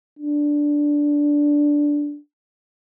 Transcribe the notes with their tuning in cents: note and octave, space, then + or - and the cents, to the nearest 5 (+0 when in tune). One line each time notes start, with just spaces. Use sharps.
D4 -5